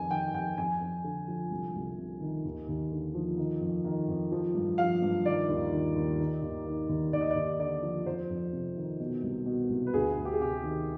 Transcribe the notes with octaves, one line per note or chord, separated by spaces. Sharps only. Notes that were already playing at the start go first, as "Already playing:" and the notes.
Already playing: F2 D#3 G#5
D#3 G5
F2 G5
F2 G#5
F2
D3
F3
C2
C2
C3
D#3
D#2
D#2
D3
F3
D#3
F2
D#3
F2
F3
G2
F3 F5
G2
D#3 D5
D#2
D#3
D#2
D#3
D#2
D#3
D#2
D#2 D5
D#5
D#2 D5
D3 D5
F3
F2 C5
F2
C3
D#3
B2
C2
B2
C2
B4
D2 G#4
D2
G4
G#4
C3 G4
D#3